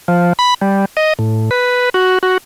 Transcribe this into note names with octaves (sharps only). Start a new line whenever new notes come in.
F3
B5
G3
D#5
A2
B4
F#4
F#4